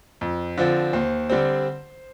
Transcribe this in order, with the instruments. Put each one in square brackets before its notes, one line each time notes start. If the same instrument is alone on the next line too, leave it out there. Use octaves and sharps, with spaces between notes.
[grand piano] F2
D3 F3 C4
D#2 C5
D3 G3 C4